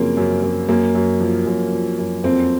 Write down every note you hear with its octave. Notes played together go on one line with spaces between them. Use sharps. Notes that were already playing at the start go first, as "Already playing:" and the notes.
Already playing: F#2 C#3 F3 A#3 C4
F#2
F#2
F#2 A#3
F#2
F3
F#2
F3
F#2
F2 C4